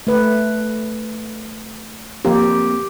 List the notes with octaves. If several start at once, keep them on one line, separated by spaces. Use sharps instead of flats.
A3 B4
F2 A#3 C4 G4